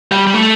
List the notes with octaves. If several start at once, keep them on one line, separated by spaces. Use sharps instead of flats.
G3
G3
A3